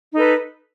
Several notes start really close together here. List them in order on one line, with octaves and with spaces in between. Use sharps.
D#4 A4 B4